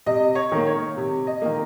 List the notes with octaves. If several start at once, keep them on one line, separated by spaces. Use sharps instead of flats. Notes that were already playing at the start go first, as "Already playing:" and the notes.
C3 D#5
C#5
D#3 A#3
C#5
C3
D#5
D#3 A#3